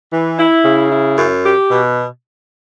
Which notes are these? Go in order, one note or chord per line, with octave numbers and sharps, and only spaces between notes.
E3
E4
C#3
E4
F#2
G4
B2